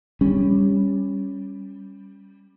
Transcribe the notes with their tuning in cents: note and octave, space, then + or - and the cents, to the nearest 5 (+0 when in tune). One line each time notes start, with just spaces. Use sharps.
G3 +10 C#4 +0